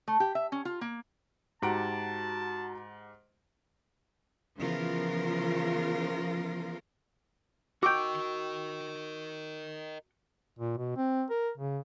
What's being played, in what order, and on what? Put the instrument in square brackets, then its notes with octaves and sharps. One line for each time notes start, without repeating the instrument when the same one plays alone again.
[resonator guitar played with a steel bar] A3
G4
E5
C#4
F4
A#3
[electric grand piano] G#2 G4 F#5 [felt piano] F#4 A#5 D7 [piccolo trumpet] A5
[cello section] C#3 E3 F3 B3 F4 A#4
[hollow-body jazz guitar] F#4 G5 [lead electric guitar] A#4 D#5 [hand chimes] C#6 E6 [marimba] D6 G6
[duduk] A#2
B2
C4
A#4
C#3